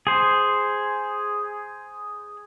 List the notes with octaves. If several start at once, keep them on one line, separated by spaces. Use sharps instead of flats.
G#4 C5